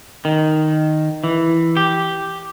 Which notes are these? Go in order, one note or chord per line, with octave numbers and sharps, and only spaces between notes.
D#3
E3
G4